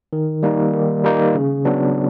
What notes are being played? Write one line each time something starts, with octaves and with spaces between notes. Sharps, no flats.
D#3
G3 A#3 D#4
D#3
G3 A#3 D#4
C#3
F#3 B3 D4